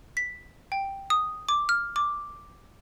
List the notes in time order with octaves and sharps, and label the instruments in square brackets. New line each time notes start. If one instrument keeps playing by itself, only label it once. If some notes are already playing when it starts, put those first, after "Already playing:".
[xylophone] B6
G5
D#6
D6
F6
D6